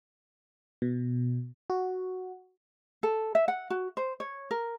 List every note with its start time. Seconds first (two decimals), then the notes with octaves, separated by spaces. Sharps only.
0.82 B2
1.70 F#4
3.03 A4
3.35 E5
3.48 F#5
3.70 F#4
3.97 C5
4.20 C#5
4.51 A#4